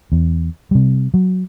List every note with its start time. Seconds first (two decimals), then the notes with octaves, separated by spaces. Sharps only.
0.12 E2
0.71 C3 G3
1.14 F#3